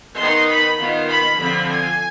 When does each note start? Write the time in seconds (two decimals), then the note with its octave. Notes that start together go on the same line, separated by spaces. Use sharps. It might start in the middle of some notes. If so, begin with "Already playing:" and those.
0.19 D#3 B3 D#4 C6
0.49 B5
0.79 D#3 B3 F4
1.08 B5
1.37 D3 F3 C4 F4 B5
1.66 G#5